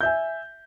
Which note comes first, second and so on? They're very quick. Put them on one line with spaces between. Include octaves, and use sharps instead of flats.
G6 E5 G#5